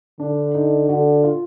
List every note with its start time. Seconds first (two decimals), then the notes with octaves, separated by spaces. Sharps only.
0.20 D3 D4
0.54 D#4
0.89 D3 F#4
1.24 F4